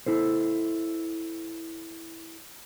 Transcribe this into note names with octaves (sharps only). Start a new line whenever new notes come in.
E4 A4 C5